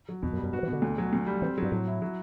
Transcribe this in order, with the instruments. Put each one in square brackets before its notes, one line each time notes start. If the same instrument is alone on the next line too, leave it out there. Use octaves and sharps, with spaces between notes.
[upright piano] F#3
[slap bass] E2 [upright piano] B2
[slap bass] F#2
[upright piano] G3
[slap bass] F#2
[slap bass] G2 [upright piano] F#4
[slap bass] E3
[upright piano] B2 [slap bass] D3
[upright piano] D2
F#3
D2
G3
[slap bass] E3 [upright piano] C4
[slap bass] G2 [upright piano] F#3
[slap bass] A2 [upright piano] F#3
[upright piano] E4
F#3